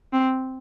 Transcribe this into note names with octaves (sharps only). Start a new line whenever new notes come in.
C4